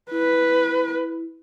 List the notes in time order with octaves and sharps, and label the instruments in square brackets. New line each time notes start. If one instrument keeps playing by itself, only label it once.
[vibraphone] E4 [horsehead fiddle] B4